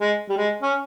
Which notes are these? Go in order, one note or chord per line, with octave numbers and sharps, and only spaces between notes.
G#3
G3
G#3
C#4